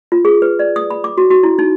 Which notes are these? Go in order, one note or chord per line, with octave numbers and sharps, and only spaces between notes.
F4
G#4
B4
D5
D#6
B5
D6
F#4
F#4
E4
D#4